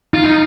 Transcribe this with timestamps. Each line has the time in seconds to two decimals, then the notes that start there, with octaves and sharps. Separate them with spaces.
0.13 D#4 F4
0.24 D#4